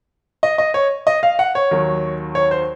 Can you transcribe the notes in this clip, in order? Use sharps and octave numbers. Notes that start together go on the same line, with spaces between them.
D#5
D#5
C#5
D#5
F5
F#5
C#5
D#2 D#3 F#3
C#5
C5